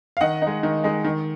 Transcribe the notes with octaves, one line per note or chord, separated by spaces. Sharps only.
F5
D#3 D#5 F#5
G#3 D#4
D#3
G#3 D#4
D#3